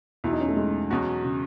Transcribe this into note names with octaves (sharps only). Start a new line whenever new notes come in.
E2 B2 F#3 E4
D#4
C#4
A3
G#3
E2 B2 F#3 C#4 F#4
C#3